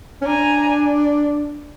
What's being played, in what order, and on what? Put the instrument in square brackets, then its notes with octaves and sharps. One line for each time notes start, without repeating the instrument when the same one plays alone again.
[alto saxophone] C#4
[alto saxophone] D4 [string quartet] G#5 A#5